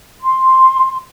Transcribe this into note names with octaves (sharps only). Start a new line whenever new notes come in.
C6